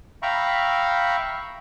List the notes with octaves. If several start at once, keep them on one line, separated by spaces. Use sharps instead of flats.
E5 F5 G5 A#5 B5 C#6